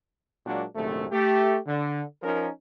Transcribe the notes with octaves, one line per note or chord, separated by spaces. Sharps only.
A#2 F#3 G#3 A#3 D4 F#4
A#1 F#2 C3 D#3 A3
A3 G4
D3
F3 C#4 D#4 A#4